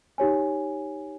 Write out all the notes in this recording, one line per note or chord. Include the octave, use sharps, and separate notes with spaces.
D#4 G4 C#5 G#5